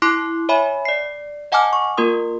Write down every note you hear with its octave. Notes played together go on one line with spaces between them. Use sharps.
E4 C6 D6 F#6 C7
C#5 E5 G#5 B5
D5 C7
D#5 F#5 G#5 A5 D6 F6
C#6
A#3 F4 A#4 C6 D#6